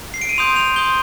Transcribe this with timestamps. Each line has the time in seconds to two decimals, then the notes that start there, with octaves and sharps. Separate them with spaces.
0.14 C7
0.21 D7
0.29 D#7
0.38 C6 D#6 G6 F7
0.56 F7
0.76 C6 D#6 G6 G7